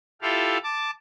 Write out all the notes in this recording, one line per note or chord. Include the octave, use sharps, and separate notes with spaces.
E4 F4 G4 A4 F5
A5 D6